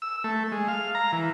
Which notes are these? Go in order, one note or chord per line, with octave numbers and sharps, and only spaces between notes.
E6
A3
G#3
F5
A#5
E3